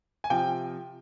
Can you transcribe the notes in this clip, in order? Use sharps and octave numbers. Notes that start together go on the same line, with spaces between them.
G#5
C3 F3 G5